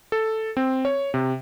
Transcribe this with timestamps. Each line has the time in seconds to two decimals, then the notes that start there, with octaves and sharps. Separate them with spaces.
0.12 A4
0.57 C4
0.85 C#5
1.14 C3